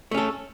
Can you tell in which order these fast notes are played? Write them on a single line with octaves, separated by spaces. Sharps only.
A3 C#4 A4